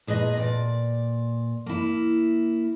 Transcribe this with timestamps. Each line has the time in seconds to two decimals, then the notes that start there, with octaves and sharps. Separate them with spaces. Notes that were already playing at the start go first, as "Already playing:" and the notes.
0.07 A#2 G#4 B4 D#5
0.37 A#2 D5
1.66 A#3 E4